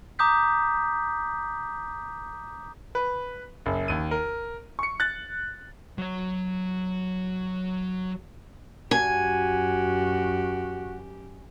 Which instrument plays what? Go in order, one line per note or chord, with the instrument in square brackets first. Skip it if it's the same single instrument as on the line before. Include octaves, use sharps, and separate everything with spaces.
[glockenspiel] A#5 D6 D#6 G6 B6
[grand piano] B4
F#1
D#2 D#7
A#4
C#6 C#7
F#6 A6
[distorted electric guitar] F#3 C#5
[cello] F#2 G4 [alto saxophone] F#4 [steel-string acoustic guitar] G#5